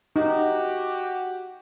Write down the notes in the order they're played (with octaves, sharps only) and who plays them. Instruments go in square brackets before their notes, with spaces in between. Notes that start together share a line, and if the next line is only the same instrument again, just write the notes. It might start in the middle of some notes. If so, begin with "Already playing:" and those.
[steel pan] D#4 [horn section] F#4 G4